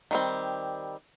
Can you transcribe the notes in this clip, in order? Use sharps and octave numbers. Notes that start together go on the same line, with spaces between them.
D#3 G3 C4